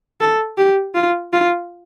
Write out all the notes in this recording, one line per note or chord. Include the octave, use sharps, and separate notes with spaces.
A4
G4
F4
F4